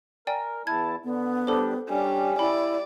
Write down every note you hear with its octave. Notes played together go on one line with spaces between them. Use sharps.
A#4 D5 G5 G#5
E2 E4 A5 G#6
D3 B3
G3 D4 G4 A4 C5
G3 C#4 D4
E4 D5 B5